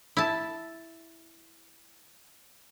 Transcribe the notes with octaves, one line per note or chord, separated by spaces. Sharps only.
E4 A5